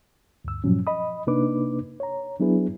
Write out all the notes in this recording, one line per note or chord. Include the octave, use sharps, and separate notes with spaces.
D2 G2 E6
G2 A#2 F3 F#3 C#4
D#5 B5 D#6
C3 A#3 D4 D#4 B4 D6
C#5 A#5
F#3 B3 D4 E4 G#4 B4